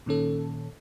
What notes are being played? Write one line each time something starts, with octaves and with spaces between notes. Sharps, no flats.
A#2 D#3 C#4 A4